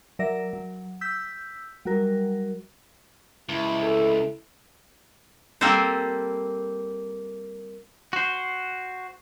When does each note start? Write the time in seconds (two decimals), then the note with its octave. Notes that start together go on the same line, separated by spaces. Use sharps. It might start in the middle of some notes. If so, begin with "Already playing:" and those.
0.19 F#3 A#4 D5 E5 A#6
0.53 F#3
1.01 E6 G6 B6
1.85 F#3 G3 F#4 A#4
3.49 C#2 E4
3.82 A4
5.61 G3 A#3 C4 G4 A4 C5
8.13 F#4 C5